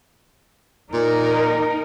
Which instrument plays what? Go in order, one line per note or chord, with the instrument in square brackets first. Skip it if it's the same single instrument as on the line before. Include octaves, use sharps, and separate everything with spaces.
[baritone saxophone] A#2 [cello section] D#4 A#4